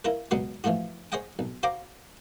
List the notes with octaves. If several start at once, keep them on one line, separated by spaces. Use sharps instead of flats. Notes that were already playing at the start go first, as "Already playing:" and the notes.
E4 F4 A#4 B4
C#2 B2 F#3 B3 B4 C6
E3 F3 A3 F4 F#4
G#4 C5 C#5 D#5 F#5 G5
B1
F#4 C5 F5 G5 A#5 D6